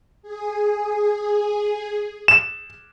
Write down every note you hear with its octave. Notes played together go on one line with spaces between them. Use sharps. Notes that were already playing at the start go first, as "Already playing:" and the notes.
G#4
E7